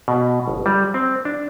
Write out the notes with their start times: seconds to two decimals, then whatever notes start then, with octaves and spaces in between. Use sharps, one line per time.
0.08 B2
0.48 G1
0.66 G3
0.94 C4
1.25 D4